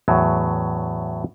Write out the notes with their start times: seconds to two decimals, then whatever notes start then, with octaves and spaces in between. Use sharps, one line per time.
0.08 E2 A2 F#3